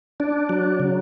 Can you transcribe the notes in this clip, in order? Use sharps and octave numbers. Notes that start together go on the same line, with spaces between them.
D4
F#3
C#3